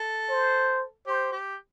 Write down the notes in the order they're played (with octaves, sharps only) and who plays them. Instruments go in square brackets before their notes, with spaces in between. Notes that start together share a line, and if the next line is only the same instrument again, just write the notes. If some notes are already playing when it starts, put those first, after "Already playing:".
Already playing: [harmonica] A4
[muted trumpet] C5
[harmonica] G4 [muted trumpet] C5
[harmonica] G4